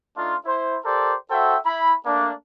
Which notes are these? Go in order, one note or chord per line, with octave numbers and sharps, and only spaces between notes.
A3 D4 D#4 F4
E4 C5
G4 A4 A#4 C5 D5
F#4 A4 C5 E5 G5
E4 B5
A3 A#3 D4